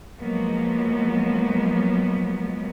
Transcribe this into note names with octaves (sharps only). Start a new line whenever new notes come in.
F3 F#3 G#3 A#3 B3